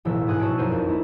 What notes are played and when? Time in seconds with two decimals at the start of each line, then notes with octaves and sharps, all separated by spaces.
0.05 E1 A1 F3 E6
0.27 G#2 G#5 D#6 F#6
0.40 B2 F#4 C#5 A5 E6 D7
0.58 A#1 F#2 D#4 C5 D#7
0.72 F2
0.87 G#3 A#3 E4